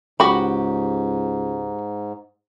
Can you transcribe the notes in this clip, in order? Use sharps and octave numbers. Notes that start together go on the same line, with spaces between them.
C#2 G#2 F#4 G4 B5